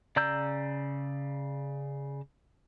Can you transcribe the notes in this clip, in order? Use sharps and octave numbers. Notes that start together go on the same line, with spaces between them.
C#3 D5 A#5 E6 G6